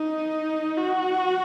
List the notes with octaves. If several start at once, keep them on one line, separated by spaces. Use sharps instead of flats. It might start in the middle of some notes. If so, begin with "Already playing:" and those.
Already playing: D#4
F#4